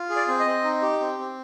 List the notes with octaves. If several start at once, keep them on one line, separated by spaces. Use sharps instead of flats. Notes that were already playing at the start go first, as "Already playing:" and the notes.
Already playing: F4
G#4
D5
C4
D#5
C4
D#4
G4
C4
C4